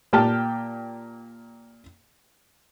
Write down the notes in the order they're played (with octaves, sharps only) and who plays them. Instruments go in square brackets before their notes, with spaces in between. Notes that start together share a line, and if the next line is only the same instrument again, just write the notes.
[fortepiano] A#2 G4 G5 A5 F6